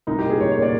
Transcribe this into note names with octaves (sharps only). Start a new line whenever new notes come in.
C2 D#4
G4
A#2
G#4
C2 C#5
C#5
A#2
D5